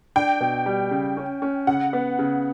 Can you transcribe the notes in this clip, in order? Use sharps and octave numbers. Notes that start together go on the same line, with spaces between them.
D4 G5
B2
G3
C#3
C#4
C#4
C#3 F#5
B3
C#3